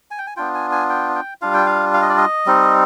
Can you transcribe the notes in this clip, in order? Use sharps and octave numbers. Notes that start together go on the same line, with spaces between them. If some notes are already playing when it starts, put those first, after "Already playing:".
G#5
G5
G#5
B3 D4 F4 G5
G#5
G#5
G5
G5
G3 D4 F4 F5
G5
F5
F5
D#5
D5
D#5
G3 C4 D#4